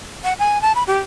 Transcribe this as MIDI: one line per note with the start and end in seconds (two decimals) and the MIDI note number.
0.24 0.34 78
0.39 0.61 80
0.62 0.73 81
0.75 0.83 83
0.87 0.99 67